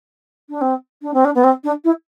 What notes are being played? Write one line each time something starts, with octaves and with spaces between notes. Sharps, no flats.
D4
C4
D4
C4
D4
B3
C4
D4
E4